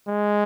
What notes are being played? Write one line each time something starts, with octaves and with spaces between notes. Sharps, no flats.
G#3